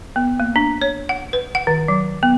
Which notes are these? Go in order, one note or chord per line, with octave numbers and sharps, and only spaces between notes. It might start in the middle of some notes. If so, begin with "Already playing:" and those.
B3
A#3
D4
C#5
F#5
B4
F#5
D#3
F#3
B3